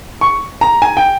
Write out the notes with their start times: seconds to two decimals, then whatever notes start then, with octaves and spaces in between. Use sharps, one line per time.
0.21 C#6
0.61 A#5
0.82 G#5
0.97 G5